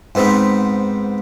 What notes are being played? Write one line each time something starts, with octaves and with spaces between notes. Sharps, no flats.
G#2 B3 C4 D#4